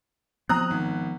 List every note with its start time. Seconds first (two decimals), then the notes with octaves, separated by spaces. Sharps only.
0.49 F3 B3 C4 A#5 D#6 F#6
0.71 G#1